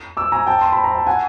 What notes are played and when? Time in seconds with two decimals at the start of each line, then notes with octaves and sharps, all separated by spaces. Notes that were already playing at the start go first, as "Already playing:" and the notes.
0.17 D6 E6
0.32 G#5 A#5
0.47 G5 A5
0.61 C6
0.72 B5
0.84 A#5
0.95 A5
1.07 F#5 G#5